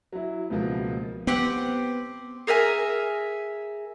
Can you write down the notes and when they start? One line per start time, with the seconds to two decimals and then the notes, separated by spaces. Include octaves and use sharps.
0.12 F#3 E4
0.50 C#2 B2 F3 A#3
1.27 B3 C4 G4 F#5
2.47 G#4 A#4 E5 G#5